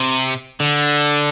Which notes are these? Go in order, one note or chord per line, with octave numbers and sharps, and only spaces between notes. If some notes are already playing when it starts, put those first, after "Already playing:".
Already playing: C3
D3